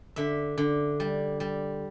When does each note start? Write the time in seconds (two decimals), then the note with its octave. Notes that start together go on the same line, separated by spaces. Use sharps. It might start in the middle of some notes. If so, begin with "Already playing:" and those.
0.16 D3 E5
0.58 D3
1.00 G3
1.40 G3